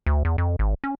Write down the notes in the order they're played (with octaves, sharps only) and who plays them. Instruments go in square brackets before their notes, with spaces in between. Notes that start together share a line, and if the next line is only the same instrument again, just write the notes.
[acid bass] D2
E2
F2
G#1
C#4